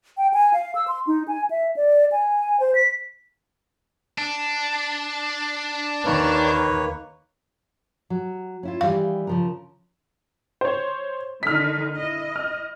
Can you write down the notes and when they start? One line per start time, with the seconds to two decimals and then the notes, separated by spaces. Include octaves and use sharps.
0.17 G5
0.34 G#5
0.53 F5
0.75 E6
0.88 C6
1.07 D#4
1.28 G#5
1.51 E5
1.76 D5
2.12 G#5
2.60 C5
2.75 B6
4.18 D4
6.05 D#2 D#3 A#3 B4 C#5
8.10 F#3
8.63 C#4 E4 F4
8.81 D#3 E3 G3 F5
9.27 C#3 F3 A#4
10.61 C5 C#5
11.43 D3 D#3 D#4 F6 B6
11.97 E4 D#5
12.36 F6